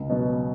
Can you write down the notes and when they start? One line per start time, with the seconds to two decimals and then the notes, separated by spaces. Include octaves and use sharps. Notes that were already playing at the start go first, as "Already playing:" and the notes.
Already playing: C#2
0.10 B2 F#3 B3